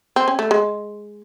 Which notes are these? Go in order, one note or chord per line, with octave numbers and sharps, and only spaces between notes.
C4
C#4
A3
G#3